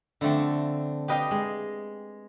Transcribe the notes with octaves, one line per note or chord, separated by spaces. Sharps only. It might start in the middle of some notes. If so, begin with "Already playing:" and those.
D3 F3 A3 C4
G4 B4 D#5 F5 G5
G#3